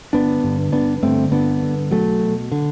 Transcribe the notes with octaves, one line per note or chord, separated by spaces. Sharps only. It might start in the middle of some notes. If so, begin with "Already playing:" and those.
G1 B3 D4
G2 D3
G1 B3 D4
G2 D3 A3 C4
G1 B3 D4
G2 D3
B1 F#3 A3
B2
D3